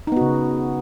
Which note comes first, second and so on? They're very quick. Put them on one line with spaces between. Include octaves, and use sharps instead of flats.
D#4 B3 F#4 C#3